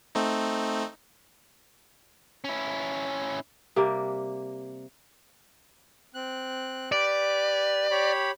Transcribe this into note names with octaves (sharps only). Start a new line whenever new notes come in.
A3 C4 D#4
C#4 E4
C3 G3 A#3
C4 F#6
G4 B4 D5
G4 C#5 B5